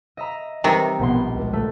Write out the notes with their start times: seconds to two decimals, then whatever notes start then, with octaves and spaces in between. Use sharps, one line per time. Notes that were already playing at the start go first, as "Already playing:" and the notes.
0.17 D#5 E5 A#5
0.64 C3 D#3 E3 G3
0.99 A#1 B2 B3 C6
1.31 C#2
1.53 A3